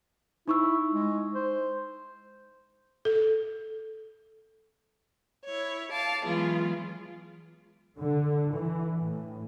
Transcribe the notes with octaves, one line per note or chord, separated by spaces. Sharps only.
D#4 E4 C#6 E6
G#3
C5
A4
E4 C#5
F5 A5 D6
E3 F#3 G#3 B3 F4 G#4
D3
E3
A2